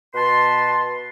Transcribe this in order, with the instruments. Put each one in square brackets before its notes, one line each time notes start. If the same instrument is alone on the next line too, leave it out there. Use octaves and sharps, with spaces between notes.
[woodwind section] B2 B4 A5 C6